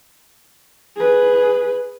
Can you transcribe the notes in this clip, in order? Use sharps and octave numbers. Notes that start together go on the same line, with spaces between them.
G#4 B4